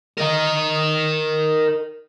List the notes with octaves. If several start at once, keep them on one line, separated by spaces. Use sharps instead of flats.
A#4 D#5